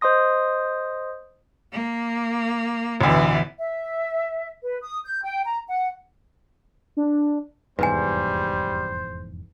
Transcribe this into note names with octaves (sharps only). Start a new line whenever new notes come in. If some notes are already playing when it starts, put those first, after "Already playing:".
C5 D#5 C6 D#6 A#6
A#3
A1 D2 B2 E3
E5
B4
D#6
G6
G5
A#5
F#5
D4
F1 E2 G#2 G3 B4 C5 G#5